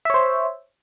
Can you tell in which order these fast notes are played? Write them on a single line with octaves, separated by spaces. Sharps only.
E5 C#5 C5